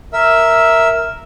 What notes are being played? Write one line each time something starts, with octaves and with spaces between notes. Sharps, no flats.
A#4 E5 E6